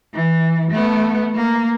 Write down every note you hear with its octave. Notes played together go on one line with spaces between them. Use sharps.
E3
A3 B3
A#3